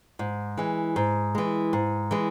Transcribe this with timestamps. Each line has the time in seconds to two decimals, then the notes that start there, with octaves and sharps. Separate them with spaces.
0.19 G#2
0.57 E3 G#3
0.96 G#2
1.35 E3 G#3
1.73 G#2
2.11 E3 G#3